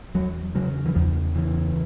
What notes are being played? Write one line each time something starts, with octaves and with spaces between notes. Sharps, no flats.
E2 F#3
C#3 F#3
E3
E2 F3
C#3 E3